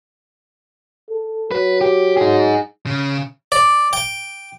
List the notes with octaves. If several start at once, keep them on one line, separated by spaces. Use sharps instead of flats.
A4
F#3 B4
G4
D#4 G#4
C#3
D5
G5